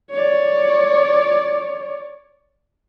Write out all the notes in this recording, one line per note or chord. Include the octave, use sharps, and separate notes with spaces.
C#5 D5